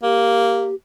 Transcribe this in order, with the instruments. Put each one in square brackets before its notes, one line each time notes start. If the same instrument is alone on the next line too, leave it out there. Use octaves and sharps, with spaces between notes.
[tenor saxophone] A#3 [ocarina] G4